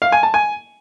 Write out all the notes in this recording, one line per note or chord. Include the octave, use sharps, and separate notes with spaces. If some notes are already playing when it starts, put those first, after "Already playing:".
F5
G#5
A5
G#5